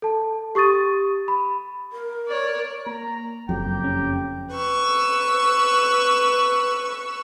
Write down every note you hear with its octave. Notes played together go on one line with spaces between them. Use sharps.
A4 A5
G4 C#6 D#6 A6 D#7
B5
A#4
C#5 D5
A#3 A#5
F#1 F2 F#3 G4 G5 A#5
C#4
B4 C#6 E6